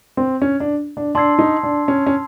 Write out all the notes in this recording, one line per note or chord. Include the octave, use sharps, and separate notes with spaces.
C4
C#4
D4
D4
D4 A5 C6 E6 G#6 C7
D#4
D4
C#4
C#4